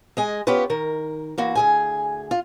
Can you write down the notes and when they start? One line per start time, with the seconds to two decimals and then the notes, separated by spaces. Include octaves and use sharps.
0.17 G#3 D#5 G#5
0.47 B3 C#4 F4 G4 B4
0.70 D#3 A#4
1.38 E3 A#3 F#4
1.55 D2 G#4 G#5
2.31 F4